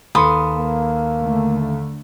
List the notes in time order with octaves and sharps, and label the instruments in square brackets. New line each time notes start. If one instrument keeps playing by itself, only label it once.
[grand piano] D#2 A4 C#7 [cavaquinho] B4 C6 D#6
[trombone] A#3
[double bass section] D3 A3